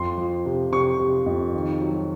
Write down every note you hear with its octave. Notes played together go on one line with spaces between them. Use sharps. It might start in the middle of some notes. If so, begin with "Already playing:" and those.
Already playing: F2 C6
F3
C3
C3 C#6
C3
F2
D#3
F#3